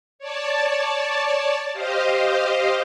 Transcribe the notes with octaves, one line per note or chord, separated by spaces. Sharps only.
C#5 D5 A5
G4 C5 D#5 F5